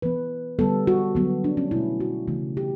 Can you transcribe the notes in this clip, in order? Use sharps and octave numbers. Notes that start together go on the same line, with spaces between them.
E3 B3 B4
D3 G3 B3 A4
F#4
D3 F#3 B3
D4
C#4
B2 A3 E4
F#4
C#3 E3 A3
G4